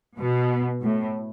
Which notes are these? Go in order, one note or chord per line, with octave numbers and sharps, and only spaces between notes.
B2
A2